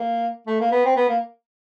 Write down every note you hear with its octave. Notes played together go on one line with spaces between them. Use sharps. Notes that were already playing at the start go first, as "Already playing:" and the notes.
Already playing: A#3
A3
A#3
B3
C4
B3
A#3